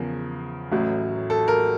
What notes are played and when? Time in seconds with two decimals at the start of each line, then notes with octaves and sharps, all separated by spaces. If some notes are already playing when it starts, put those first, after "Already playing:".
Already playing: E2 C#3 F3 A#4
0.72 A1 A2 F#3
1.30 A4
1.48 A#4